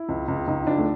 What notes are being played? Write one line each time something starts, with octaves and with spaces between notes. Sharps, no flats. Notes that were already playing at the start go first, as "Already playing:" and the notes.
Already playing: E4
C#2
C#2
C#2 D#4
C#2 D4
A3